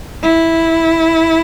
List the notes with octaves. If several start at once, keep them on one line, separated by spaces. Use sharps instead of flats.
E4